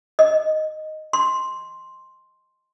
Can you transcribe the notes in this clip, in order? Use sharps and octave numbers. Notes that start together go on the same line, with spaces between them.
D#5
C6